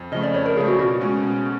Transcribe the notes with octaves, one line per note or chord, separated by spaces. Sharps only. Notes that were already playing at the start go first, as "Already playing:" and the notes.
Already playing: F2
C#3 F3 A3 D#5
D5
F2 C#5
A#4
C#3 F3 A3 G#4
F#4
B2 F#4
G#3 C#4
B2